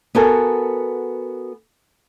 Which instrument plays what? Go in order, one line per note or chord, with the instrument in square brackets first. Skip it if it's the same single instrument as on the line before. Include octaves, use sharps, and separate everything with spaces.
[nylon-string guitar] B3 F#4 A4 A#4 G#5